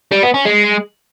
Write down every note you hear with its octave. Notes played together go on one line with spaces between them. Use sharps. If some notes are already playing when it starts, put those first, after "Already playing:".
G3
B3
C#4
G#3